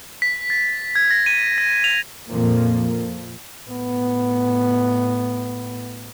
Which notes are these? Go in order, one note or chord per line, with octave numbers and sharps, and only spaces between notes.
B6
A6
G#6
A#6
D#7
A#6
F7
F2 A#2 F3 A#3
A2 B3